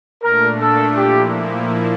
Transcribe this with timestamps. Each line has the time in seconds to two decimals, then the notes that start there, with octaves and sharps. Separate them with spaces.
0.22 A#2 A3 D4 A#4
0.60 A4
0.96 A#2 F3 A#3 E4 G4